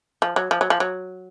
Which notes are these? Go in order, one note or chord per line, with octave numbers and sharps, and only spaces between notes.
F3
F#3
F3
F#3
F3
F#3